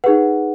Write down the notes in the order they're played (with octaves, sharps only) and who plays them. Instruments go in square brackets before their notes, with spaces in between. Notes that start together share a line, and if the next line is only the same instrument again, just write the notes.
[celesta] D#4 G#4 B4 F#5